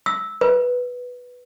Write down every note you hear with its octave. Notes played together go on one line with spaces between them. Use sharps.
E6
B4